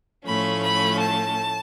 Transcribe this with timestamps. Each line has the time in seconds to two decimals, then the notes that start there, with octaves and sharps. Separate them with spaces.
0.25 A2 F3 A3 C#4 B5
0.63 B5
0.99 A5